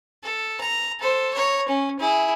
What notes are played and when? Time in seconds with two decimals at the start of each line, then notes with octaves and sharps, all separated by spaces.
0.24 A4
0.61 A#5
1.00 A4 C5
1.35 C#5 A#5
1.68 C#4
1.99 E4 G#4